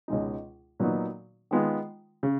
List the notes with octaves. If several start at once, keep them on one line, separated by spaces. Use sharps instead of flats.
C#2 B2 G#3 D#4
A#2 F#3 B3 D#4 F#4
D#3 G#3 B3 F4
C#3